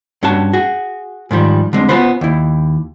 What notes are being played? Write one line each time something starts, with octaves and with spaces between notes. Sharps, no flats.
G2 C#4 F#4 A5
F#4 G#4
G#2 D#3 F3 G3
D3 G#3 C4
B3 C#4 F4 B4 C5 B5
D#2 E4